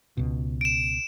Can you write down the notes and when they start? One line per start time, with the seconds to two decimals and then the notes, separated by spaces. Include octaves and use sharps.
0.17 C#2 B2
0.61 D7 E7